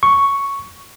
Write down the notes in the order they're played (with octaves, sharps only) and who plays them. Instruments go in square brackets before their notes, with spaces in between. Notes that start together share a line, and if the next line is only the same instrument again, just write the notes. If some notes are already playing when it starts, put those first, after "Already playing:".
[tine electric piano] C#6